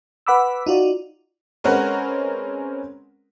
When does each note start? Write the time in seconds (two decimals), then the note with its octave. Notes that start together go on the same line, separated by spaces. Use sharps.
0.27 B4 F#5 B5 D6 E6
0.66 D#4 F4 F#4 D5
1.64 G#3 C4 C#4 A#4 B4 F#5